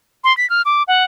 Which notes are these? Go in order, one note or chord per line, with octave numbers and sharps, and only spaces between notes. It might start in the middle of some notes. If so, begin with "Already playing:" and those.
C6
B6
F6
D6
F#5